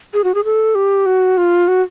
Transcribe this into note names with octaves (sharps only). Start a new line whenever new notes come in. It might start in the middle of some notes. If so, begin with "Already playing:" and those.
G#4
F#4
G#4
A4
G4
F#4
F4
F#4